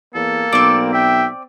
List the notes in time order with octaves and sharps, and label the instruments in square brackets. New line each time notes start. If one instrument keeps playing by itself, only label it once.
[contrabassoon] E2 [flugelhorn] A#3 [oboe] A4
[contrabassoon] B1 [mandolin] C4 D5
[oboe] E5 [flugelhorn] G5